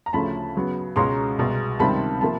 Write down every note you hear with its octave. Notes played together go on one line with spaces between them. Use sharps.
A#5
D2 C#3 F3 A3 C#4 A5 B5
C#3 F#3 B3
C#2 B2 G#3 C#4 A#5 C6
C2 B2 G#3
C#2 C3 D#3 G3 C4 A5 B5
C3 F3 A#3 A5 B5